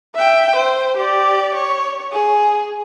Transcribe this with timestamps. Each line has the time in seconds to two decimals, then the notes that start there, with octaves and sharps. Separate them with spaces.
0.15 E5 G5
0.56 C5
0.97 G4 D5
1.54 C#5
2.13 G#4